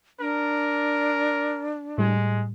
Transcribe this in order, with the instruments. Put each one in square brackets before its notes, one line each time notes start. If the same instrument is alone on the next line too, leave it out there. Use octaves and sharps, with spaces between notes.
[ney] D4 [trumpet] A#4
[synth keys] A2 G3 [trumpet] G#3